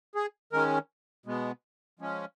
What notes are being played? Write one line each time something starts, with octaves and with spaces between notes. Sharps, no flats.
G#4
D#3 G#3 C#4 A#4
B2 G#3 B3
F3 G#3 C#4